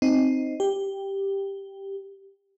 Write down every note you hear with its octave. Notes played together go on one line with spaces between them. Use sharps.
C4 D#4
G4